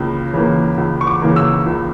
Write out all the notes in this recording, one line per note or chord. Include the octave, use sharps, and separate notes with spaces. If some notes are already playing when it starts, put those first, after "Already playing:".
Already playing: C#2 C#3 A#3
C#3 E3 A#3
C#2
C#6
D6
C#3 E3 A#3
E6
C#2